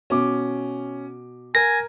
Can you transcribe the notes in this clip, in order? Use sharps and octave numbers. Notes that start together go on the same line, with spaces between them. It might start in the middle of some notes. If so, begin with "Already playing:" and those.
B2 C#4 D6
A#4 G#5 A#6